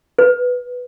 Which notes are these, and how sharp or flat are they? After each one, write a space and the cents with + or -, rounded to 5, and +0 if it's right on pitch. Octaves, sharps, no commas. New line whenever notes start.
B4 -5